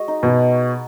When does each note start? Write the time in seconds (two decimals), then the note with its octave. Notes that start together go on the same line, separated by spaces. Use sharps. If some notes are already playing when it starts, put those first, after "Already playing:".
Already playing: G#3 F#4 D#5
0.08 D#4
0.23 B2 B3
0.37 B3